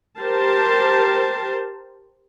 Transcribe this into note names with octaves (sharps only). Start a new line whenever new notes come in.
G4 A#4 C5 A5